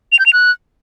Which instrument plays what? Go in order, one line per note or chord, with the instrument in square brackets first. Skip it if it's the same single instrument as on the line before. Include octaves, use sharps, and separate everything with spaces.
[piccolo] F7
G6
F7
F#6